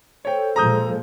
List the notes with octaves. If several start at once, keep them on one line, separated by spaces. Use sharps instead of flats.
A4 C5 C#5 G5
A#2 F3 G#3 A#5 D#6 G6